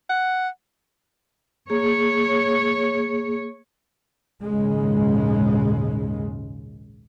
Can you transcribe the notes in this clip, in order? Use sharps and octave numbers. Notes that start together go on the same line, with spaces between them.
F#5
A#3 G#4 C#5
A#1 D#2 G#2 C#3 G#3